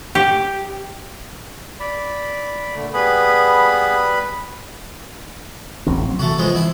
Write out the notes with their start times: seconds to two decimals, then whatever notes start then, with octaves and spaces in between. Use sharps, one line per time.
0.15 G4
1.80 D5 B5
2.73 A#2 D3 A3
2.94 G3 B3 G#4 B4 B5
5.87 D#1 A1 C4
6.02 F#3 C4
6.19 C3 E3 A3 F#4
6.38 F3 G#3 B3
6.55 E3 E4 B5